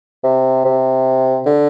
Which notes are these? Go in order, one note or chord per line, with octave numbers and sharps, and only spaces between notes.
C3
C3
D3